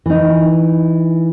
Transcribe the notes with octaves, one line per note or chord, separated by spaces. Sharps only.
E3 D#4